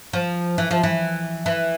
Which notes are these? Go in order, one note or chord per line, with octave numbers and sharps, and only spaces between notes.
F3
E3
F3
E3
E3